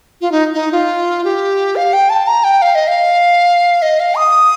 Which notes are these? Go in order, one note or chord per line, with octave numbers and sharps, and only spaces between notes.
F4
D#4
D#4
F4
G4
F5
G5
A5
A#5
G5
F5
D#5
F5
D#5
F5
D#6